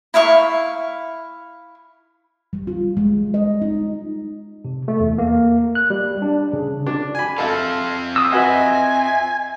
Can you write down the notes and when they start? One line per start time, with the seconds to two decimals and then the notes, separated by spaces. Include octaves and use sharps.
0.14 E4 E5 F5 C#6
2.53 G3
2.67 F4
2.97 G#3
3.34 D#5
3.62 D#4
4.65 C3
4.88 A3
5.00 E2
5.18 A#3
5.75 F#6
5.90 G3
6.22 D4
6.53 C#3
6.87 D4
7.15 G#5 B5
7.38 C4 F4 A4 E5 F5
8.16 D#6 E6
8.32 F#4 B4 D#5 E5 G#5